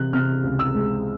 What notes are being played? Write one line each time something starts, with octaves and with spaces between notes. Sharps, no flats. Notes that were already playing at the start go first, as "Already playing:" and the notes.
Already playing: C3 E3 F#6
C3 F6
C#2
E6
G#3